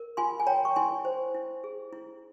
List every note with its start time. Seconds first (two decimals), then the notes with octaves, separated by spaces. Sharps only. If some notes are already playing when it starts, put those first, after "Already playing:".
Already playing: A#4
0.17 F4 G#5 C6
0.40 G#5
0.47 C#5 G5 A#5
0.65 C#6
0.76 E4 G#5 C6
1.05 C5
1.35 E4
1.64 G#4
1.93 E4